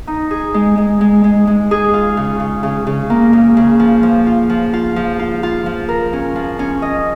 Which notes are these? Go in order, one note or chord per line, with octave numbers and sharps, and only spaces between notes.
D#4
G#4
G#3
G#3
G#3
G#3
G#3
G#4
F4
C#3
C#3
C#3
C#3
A#3
C#3
C#3
F3
F3
F4
F3
F4
F3
F4
F4
F3
A#4
C#4
F3
C#4
D#5